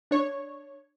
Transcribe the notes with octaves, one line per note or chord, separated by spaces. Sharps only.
D4 C#5